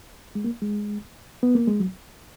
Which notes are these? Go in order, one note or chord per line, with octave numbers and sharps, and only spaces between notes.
G#3
A#3
G#3
B3
A#3
G#3
F#3